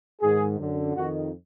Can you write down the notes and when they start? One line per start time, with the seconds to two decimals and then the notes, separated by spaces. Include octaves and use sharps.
0.22 G#2 D#3 G#4
0.59 F#2 D3
0.95 F2 D#3 F#4